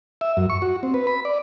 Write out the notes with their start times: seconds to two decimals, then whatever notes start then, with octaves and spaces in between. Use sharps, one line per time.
0.21 E5
0.37 F#2
0.50 C#6
0.62 F#4
0.83 C4
0.94 B4
1.07 B5
1.25 D5